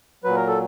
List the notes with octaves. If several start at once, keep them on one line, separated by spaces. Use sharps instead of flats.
A#2 F#3 B4
A#4
A4